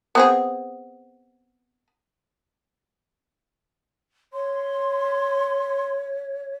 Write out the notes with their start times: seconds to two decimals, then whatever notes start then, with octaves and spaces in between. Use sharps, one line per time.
0.15 B3 C4 G#4
4.33 C#5 C6